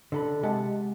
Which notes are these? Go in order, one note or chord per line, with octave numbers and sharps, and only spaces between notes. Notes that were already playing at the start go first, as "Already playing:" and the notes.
D3 A4 B5
C3 G#3 G4 F#5 A5